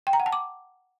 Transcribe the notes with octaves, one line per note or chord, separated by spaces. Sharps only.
G5
A#5
F#5
A5
D6